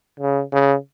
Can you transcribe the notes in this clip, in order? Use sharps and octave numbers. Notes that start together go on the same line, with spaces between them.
C#3
C#3